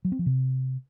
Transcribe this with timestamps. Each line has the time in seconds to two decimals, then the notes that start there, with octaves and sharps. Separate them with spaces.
0.05 F#3
0.12 C4
0.19 F3
0.26 C3